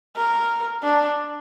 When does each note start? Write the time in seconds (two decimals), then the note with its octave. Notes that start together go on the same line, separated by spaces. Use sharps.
0.16 A#4
0.83 D4